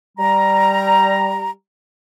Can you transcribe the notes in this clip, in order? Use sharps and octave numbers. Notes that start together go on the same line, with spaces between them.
G3 A#5